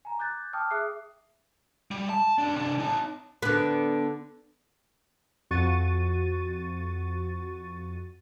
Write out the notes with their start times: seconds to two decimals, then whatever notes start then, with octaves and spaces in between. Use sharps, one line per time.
0.05 G#5 A#5
0.19 D6 F#6 G6 A6
0.53 G5 A5 D6 D#6 F6
0.71 G#4 E5 D6 D#6 F#6 C7
1.91 G3
2.09 A5
2.38 G2 D4
2.56 C3 D4
2.79 D#4 A5
3.42 D3 B3
5.51 F2 F#4 C#6 A6 D#7